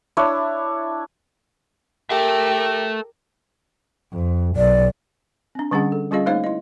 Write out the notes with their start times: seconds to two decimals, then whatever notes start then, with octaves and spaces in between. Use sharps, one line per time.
0.17 D4 E4 C#5
2.10 G4 A4 A#4 E5
4.13 F2
4.56 B1 D5
5.55 C4 D4
5.71 D3 G3 C#4 D4 G#4 F#5
5.92 A4
6.11 G3 C#4 F4 G#4 D#5 F5
6.26 A3 A#3 D#4 C5 C#5 F5
6.44 E4 D#5